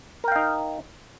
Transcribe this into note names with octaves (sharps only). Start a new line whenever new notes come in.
D#4 A#4 F5 G5